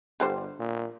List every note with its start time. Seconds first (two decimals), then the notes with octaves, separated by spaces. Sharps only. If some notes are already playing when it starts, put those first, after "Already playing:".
0.20 G1 D3 G3 C5
0.59 A#2